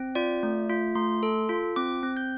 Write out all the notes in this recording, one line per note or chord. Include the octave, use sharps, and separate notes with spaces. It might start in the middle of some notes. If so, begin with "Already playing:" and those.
Already playing: C4
F4 D5
A3
F4
A3 C6
A4
F4
C4 D6
C4
G6